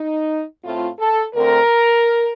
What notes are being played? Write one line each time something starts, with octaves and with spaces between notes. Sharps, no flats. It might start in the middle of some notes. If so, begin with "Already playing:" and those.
Already playing: D#4
A2 A3 C4 F4
A4
D2 D3 A3 C4 A#4